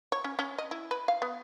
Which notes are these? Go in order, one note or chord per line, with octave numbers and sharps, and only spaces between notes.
C#5
C#4
C#4
D#5
E4
B4
F5
B3